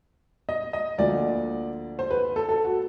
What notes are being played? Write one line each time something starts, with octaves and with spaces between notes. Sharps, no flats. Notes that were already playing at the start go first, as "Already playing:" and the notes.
D#5
D#5
D2 D3 F3 A#3 D5
C5
B4
A4
A4
F#4